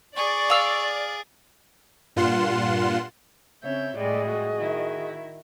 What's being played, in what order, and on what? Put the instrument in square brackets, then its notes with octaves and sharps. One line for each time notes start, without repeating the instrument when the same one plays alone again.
[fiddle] G#4 [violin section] D5 [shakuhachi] C#6
[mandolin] F5 E6
[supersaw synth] G2 A#2 F4 F#5 C6 E7
[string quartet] C#3 C#5 G6 [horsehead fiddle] C4 [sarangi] E5
[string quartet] A2 G3 G#3 [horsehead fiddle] G#4 D#5 [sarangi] D5
[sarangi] F#4
[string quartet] D#3 E4